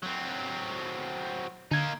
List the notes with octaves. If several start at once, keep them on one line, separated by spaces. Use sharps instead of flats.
F#3 C4
D3 A#3 D#4 G#6